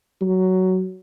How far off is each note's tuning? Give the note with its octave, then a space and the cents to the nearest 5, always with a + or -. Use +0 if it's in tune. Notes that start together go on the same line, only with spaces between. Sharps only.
F#3 +10